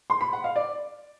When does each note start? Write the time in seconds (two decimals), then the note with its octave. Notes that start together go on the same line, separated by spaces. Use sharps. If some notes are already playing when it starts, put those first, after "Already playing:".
0.10 C6
0.21 B5
0.33 F#5
0.44 F5
0.56 D5